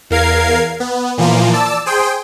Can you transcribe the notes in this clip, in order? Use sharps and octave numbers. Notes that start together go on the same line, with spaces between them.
E2 A#4 F5 G#6 C7
B3
A#2 E3 F3 A#3 F4
D5 A5 E6
G#4 C5 G5